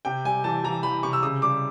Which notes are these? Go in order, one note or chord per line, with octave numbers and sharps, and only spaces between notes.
C3 G5
G3 G#5
E3 A5
E3 A#5
E3 B5
C3 C#6
E6
C#3 D#6
G3 D6